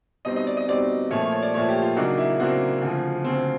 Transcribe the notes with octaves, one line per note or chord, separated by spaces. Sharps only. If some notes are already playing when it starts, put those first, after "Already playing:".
B2 G3 C4 D#4 D#5
D#5
D5
D#5
B2 G3 C4 D#4 D5
A#2 F3 A3 C#5
C#5
C#5
D5
A#2 F3 A3 C#5
G4
F4
C#3 F#3 A#3 D4 D#4 F#4
E4
C#3 F#3 A#3 C4 D4 F#4
D2 C#3 F3
D2 C#3 F3 C4